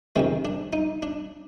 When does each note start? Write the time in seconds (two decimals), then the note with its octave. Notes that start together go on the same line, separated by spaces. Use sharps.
0.16 F2 C3 D#3 G#3 C4
0.45 D4
0.73 D#4
1.03 D4